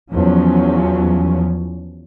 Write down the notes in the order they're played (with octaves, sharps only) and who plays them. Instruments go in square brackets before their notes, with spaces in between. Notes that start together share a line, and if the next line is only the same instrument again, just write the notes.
[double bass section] E2 F3 F#3 C#4